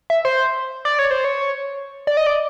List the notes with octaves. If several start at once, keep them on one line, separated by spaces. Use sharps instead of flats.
E5
C5
D5
C#5
C5
C#5
D5
D#5
D5